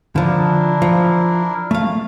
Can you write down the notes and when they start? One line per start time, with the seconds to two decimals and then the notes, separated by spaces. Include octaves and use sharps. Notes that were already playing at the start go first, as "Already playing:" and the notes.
0.16 D3 F3 D4 E4 A#4
0.82 F3
1.71 A3 F5